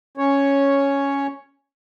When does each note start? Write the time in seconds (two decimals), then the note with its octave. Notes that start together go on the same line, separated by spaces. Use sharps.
0.17 C#4 C#5